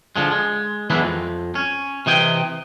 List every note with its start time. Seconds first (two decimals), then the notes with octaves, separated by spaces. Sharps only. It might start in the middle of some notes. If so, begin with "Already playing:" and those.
0.16 D3 F3 G#3
0.31 G#3
0.90 E2 E3 F#3 G#3 D4 E4
1.03 F2
1.55 C#4
2.06 C3 E3 D#5 G5